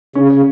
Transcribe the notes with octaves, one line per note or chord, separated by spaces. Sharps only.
C#3 C#4
C#3